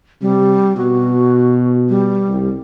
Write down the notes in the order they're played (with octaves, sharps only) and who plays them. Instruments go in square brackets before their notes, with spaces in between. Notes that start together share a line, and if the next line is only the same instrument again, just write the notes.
[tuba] C3 [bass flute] G3
[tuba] B2 [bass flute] F#4
[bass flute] G3
[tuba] C2